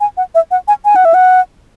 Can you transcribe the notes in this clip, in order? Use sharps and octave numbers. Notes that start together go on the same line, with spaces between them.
G#5
F#5
E5
F#5
G#5
G#5
F#5
E5
F#5